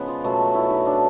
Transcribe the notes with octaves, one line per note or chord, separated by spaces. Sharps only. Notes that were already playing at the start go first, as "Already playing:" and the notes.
Already playing: C#3 F3 G#3 B3
F4
B2 F#3 A3
E4
D#4
D4